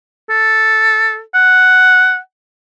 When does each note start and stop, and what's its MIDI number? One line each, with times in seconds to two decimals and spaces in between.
0.30 1.21 69
1.35 2.18 78